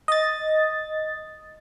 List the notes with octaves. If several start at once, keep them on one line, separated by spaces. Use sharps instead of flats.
D#5 A6